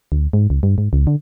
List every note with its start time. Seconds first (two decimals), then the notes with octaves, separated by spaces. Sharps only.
0.12 D2
0.33 G#2
0.50 C#2
0.63 G2
0.78 G#2
0.93 C#2
1.07 D3